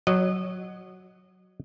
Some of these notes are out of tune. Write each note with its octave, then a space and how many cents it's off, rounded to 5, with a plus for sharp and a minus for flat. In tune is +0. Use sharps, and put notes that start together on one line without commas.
F#3 +0 D#5 -25